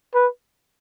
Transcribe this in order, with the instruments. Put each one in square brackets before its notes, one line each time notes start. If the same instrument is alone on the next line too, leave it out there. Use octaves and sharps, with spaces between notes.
[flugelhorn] B4